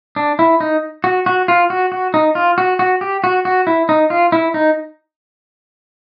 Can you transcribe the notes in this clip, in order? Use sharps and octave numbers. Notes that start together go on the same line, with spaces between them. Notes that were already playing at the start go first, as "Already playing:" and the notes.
D4
E4
D#4
F#4
F#4
F4
F#4
F#4
D#4
F4
F#4
F#4
G4
F#4
F#4
E4
D#4
F4
E4
D#4